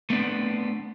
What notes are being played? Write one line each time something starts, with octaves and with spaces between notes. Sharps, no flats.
A3 B3 C4 D4